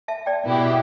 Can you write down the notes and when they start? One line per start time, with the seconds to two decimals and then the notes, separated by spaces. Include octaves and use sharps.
0.08 E5 A5
0.26 D5 G5
0.45 B2 B3 E4 G4